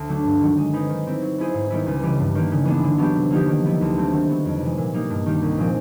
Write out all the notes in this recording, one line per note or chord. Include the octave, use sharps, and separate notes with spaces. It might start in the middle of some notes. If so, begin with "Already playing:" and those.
Already playing: D2
D3 F#3 A3 D4
G2
D#3 F#3
G#3
C4 D#4 G#4 B4
D#3
G3 C4 E4
F#3
B3 E4 G#4 C5
G#2
D#3 G3 B3 E4
C#2
C#3 E3 G3
G2
D#3 G3 A#3
C#3
E3 G#3 B3 D4
D3
F#3 B3 D4 G4
C3
F3 A#3 D#4 G4
D#3
G3 B3 E4
D2
D3 F#3 A3 C4
D#3
F#3 B3
F2
C3 E3 G#3
A#2
G3 A#3 D#4
G2
D#3 G3
C2
A#2 F3 G#3 C4